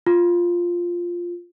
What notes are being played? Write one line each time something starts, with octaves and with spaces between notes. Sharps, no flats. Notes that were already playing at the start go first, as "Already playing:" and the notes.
F4